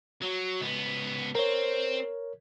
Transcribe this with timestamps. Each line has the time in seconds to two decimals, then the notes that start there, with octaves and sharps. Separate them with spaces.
0.22 F#3
0.60 C#2 B3
1.35 C4 A#4 C#5